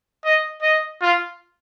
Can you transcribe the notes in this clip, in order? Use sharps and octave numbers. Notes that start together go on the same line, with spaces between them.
D#5
D#5
F4